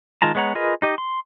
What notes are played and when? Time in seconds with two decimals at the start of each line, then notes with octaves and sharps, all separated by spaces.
0.22 D#3 G#3 F4 A5 A#5
0.35 G#3 B3 C#5 F#5 A#5
0.55 F4 G#4 A#4 B4 D#5
0.82 D#4 G4 D#5
0.98 C6